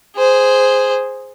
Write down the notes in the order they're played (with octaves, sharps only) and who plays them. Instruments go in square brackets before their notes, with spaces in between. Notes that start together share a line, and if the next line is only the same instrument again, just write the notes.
[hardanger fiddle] G#4 C5